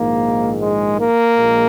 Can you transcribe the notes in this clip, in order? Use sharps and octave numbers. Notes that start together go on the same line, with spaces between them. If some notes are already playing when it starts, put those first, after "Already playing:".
Already playing: A#1 G#2 D#3 A#3
G#3
A#3
A#1 A#2 G#3